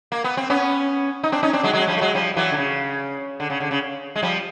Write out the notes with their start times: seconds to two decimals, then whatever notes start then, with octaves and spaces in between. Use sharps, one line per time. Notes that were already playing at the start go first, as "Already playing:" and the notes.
0.12 A#3
0.24 B3
0.37 C4
0.50 B3 C#4
1.23 D#4
1.32 C4 D4
1.43 C#4 D#4
1.53 C4 D4
1.63 F#3 G#3
1.73 F#3 G#3
1.87 F3 G3
1.97 A3
2.01 F#3 G#3
2.15 F3 G3
2.36 E3 F#3
2.52 D3
2.57 C#3
3.40 D3
3.50 C#3
3.60 D3
3.71 C#3
4.16 G#3
4.22 F3 G3